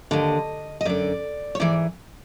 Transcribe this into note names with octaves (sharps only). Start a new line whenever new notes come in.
D#2 D3 D#5
D#5
F#2 D3 D5
C#5
G#2 E3 D5